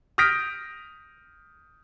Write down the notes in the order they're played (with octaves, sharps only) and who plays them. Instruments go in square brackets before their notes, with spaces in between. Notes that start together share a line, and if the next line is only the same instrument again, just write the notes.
[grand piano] D#6 F6 G6 A#6 B6 D7